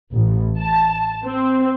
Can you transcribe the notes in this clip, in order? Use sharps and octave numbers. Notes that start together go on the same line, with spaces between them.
A1
A5
C4